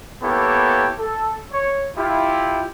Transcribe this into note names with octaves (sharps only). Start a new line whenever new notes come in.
A#3 B3 E4 G4 A4 C#5
A4
C#5
E4 F4 G4